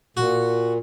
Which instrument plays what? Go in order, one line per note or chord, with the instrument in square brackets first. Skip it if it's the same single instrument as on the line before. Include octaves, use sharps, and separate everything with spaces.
[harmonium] A#2 [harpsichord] F#4